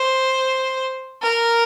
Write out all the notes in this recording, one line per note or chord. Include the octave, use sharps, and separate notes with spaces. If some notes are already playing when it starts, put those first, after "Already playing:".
Already playing: C5
A#4